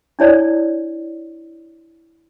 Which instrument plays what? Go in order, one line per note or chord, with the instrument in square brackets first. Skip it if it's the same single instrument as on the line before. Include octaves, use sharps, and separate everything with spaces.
[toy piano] D4 E4 C#5 D5